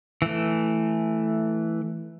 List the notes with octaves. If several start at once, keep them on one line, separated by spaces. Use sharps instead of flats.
E3 A3